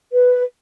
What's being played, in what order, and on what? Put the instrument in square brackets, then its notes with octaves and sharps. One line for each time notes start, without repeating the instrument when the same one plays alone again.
[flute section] B4